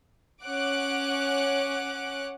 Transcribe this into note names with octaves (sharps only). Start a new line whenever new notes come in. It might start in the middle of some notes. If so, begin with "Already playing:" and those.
C#4 C#5 F#5 D6 F#6 D7